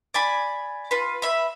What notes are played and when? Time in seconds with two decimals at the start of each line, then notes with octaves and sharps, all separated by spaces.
0.14 D5 G#5 B5
0.91 F4 B4
1.22 E5 B5